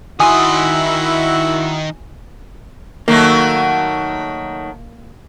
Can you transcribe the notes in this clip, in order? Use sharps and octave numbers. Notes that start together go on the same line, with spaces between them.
D#3 E4 F#4 G#5 C6 D#6
D#3 F#3 A3 A#3